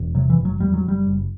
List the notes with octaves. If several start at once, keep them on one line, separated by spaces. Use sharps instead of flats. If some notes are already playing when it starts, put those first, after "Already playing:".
Already playing: E1
C3 F#3
E3
F#1
F#3
E2 G3
F#3
F#1
G3
F#1